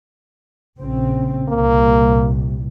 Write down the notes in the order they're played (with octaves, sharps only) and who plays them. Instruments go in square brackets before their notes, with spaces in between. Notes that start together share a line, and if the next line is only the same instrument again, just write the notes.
[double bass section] A#1 C#3 C4
[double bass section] C2 A#2 [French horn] A#3